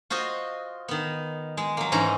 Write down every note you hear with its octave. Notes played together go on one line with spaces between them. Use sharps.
F4 F#4 C5 D#5
D#3 B3
G#3
F#3 A#3
G#2 E3 C#4 D#4 A#5